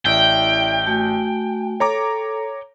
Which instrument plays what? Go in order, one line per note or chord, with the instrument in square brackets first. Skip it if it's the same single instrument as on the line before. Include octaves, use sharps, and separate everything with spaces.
[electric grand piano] A1 [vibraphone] E4 D5 E5 [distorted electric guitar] G5
[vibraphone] A3 F#4 G#5
[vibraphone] A4 [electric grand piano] C#5 A#5 D6